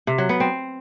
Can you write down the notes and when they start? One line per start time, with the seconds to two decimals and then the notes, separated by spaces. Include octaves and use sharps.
0.07 C3
0.18 F#3
0.29 B3
0.40 C4